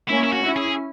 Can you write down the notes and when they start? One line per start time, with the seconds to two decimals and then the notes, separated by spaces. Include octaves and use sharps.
0.09 A#3 C#4 E4
0.24 E4
0.33 F#4
0.44 C#4 E4
0.56 G#4